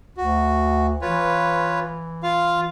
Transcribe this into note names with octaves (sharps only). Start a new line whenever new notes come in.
D2 F#4
E3 F4 B4 C#5
F4 F5